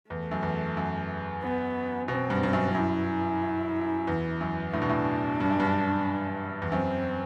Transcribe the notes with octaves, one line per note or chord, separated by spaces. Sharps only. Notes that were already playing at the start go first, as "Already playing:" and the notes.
E2 A3
F#2
E2
F#2
B3
B2 C4
G2
G2
F#2
F#2 E4
E2
F#2
A2 D4
B2
A2
G2
F#2
G2
E2
F#2 C4